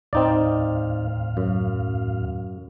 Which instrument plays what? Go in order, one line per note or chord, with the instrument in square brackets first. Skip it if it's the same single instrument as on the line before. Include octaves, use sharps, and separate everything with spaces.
[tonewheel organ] D#2 A2 F5 [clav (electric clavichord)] C4 D#4 D5
[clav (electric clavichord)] F#2